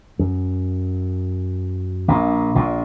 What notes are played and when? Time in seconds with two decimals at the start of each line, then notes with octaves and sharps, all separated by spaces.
0.19 F#2
2.08 A#1 A#2
2.55 A#1 A#2